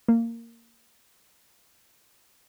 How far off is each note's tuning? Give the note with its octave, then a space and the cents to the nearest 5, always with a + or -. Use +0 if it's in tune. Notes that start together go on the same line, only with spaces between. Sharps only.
A#3 -15